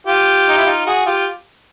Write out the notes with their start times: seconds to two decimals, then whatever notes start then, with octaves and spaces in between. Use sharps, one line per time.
0.07 F4 G4
0.49 D#4
0.57 E4
0.66 D#4 F4
0.86 F#4 G#4
1.06 F4 G4